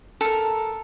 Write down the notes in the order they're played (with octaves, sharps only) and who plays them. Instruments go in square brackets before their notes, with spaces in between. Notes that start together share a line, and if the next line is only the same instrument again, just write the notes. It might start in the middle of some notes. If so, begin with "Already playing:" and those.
[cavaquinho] A4 A#4